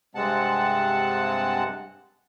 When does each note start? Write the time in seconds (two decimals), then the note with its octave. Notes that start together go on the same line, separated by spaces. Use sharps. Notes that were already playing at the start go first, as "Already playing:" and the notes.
0.15 G2 C3 G#3 C4 F#5 A5